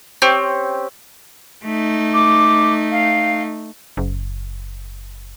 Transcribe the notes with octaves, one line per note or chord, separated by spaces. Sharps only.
C4 C#4 G4
A3 D#4
D6
F5
F#1